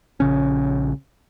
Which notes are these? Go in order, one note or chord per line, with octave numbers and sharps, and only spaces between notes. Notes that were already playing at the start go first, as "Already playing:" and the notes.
A#1 C#3 C#4